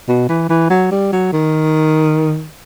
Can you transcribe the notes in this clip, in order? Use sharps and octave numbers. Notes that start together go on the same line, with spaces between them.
B2
E3
E3
F#3
G3
F#3
D#3